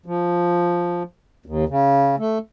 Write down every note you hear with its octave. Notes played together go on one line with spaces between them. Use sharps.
F3
D#2
C#3
A3